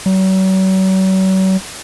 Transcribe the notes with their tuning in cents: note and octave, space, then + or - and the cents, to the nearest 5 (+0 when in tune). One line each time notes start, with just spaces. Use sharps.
F#3 +40